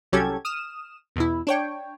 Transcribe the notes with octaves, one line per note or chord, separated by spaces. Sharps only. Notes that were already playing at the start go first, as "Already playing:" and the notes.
C2 F#3 C#4 G4 A4 G#6
D#6 F6 E7
E2 B2 E4
D4 C#5 G5